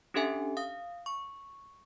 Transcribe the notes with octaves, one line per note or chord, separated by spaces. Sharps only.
C#4 D4 G4 A4 E5 G#5
F5 D#6
C#6